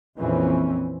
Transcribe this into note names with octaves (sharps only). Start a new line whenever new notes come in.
A#1 F2 E3 C4 C#4